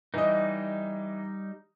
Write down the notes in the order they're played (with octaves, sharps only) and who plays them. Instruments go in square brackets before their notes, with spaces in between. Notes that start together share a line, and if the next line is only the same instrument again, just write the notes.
[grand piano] E3 D#5 [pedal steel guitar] G3 D#4